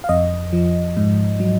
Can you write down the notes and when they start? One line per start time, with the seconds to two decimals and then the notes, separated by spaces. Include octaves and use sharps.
0.04 F5
0.09 F2 D#5
0.53 F3
0.97 G#2
1.40 F#3